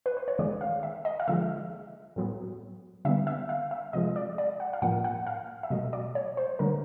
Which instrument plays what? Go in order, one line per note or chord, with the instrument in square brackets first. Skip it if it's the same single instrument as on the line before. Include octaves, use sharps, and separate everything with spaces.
[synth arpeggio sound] B4
C5
C#5
D#3 G#3 B3 D5
F5
E5
D#5
F5
D3 F3 G#3 E5
A2 F#3 B3
D3 G3 B3 E5
E5
F5
E5
C3 F3 G#3 D#5
D5
D5
F#5
F5
A2 F3 A#3 F#5
F#5
F5
E5
B2 F#3 A3 D#5
D5
C#5
C5
D3 F#3 A3 A#4